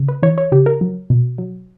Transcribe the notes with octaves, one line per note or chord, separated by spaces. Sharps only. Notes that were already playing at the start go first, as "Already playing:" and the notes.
Already playing: C#3
B4
E3 C#5
C#5
C#3 G4
A#4
F#3
B2
F#3